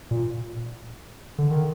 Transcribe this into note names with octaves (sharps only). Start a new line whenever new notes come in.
A#2
D3
D#3